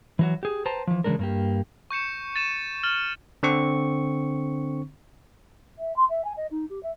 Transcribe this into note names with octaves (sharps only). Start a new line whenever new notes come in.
E3 F#3 F#4
G4 G#4
B4 C5 G5 A5 A#5
E3 F3
C#3 E3 F3 G#3 D4 A#4
G2 A#3 G4
C#6 G6 C#7 E7
A6 D#7 E7
F6 A6 F#7
D3 C4 C#6
E5
C6
E5
G#5
D#5
D#4
G4
E5